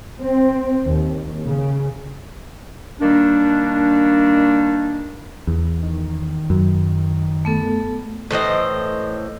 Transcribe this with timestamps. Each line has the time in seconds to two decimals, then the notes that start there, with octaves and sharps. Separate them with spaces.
0.21 C4
0.87 D#2
1.47 C#3
3.01 D#3 G3 A#3 D4
5.47 E2
5.83 D#3
6.50 F#2
7.45 A3 B3 A4
8.31 A2 E3 C5 D#5